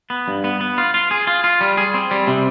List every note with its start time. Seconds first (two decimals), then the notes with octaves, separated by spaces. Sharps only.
0.10 B3
0.28 G2
0.44 B3
0.61 B3
0.78 F4
0.94 F4
1.11 G#4
1.27 F4
1.44 F4
1.61 G3
1.77 G#4
1.94 C4
2.11 G3
2.27 C3